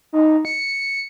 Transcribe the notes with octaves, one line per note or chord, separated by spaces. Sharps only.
D#4
C#7